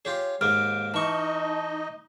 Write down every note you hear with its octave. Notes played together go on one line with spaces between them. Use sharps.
F4 G4 G#4 C#5
D#2 G#2 A#3 F6 D7
E3 D#4 D#5 A5 C#6